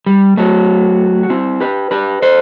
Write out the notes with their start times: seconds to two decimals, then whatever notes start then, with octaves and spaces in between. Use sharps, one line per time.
0.06 G3
0.37 F#3 A3
1.23 F#4
1.30 C4 E4
1.61 G4 B4
1.91 G4 B4
2.22 A4 C5